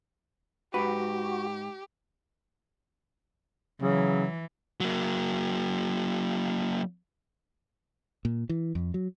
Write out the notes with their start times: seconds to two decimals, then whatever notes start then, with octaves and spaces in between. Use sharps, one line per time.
0.74 G#2 F#4 G4 B4
3.82 C#3 E3 F#3
4.80 F#3 A#3
8.25 A#2
8.49 E3
8.75 F2
8.94 F#3